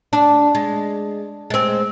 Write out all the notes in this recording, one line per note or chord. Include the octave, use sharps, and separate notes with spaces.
D4
G#3
G#3 C4